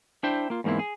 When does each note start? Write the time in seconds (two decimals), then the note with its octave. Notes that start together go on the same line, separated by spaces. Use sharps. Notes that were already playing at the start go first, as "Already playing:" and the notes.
0.23 D4 E4 C5 E5 G5
0.50 A#3 F4
0.64 E2 G#2 A#3 C4 E4
0.79 G#4